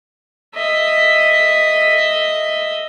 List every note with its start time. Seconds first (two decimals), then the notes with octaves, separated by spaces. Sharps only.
0.55 D#5 E5